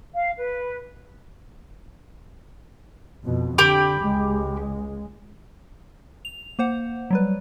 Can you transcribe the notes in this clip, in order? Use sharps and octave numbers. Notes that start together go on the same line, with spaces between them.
F5
B4
F2 B2
D3 G4 B5 D6
C#2 G#3
F7
A#3 C5 F#5
F#3 G3 B4